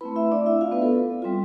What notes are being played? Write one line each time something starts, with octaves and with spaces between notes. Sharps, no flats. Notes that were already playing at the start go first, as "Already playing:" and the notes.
A3 C4 E4 B4 B5
E4 E5
D4 D5
E4 E5
F4 F5
B3 B4
A4
G3 C4 F4